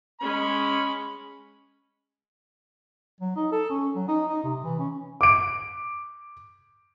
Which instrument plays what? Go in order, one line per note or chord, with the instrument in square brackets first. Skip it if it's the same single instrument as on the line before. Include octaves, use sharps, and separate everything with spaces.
[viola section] G#3 C#4 [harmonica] B5
[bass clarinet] F#3
D#4
A4
C#4
F#3
D#4
D#4
C3
E3
C#4
[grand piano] D6 D7